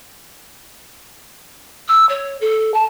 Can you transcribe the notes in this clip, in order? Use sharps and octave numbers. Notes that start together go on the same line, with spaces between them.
E6
C#5
A4
A5